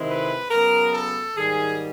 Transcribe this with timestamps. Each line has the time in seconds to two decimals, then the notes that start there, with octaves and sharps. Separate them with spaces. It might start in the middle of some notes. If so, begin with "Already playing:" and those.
Already playing: C3 D#3 G#3 C4 E4
0.09 B4
0.51 C#3 F#3 B3 A#4
0.94 A4
1.36 G#2 D#3 G3 G#4